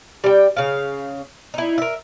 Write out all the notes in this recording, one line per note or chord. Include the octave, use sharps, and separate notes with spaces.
G3 G5
C#3 F5
D#4 E4
A#4 E5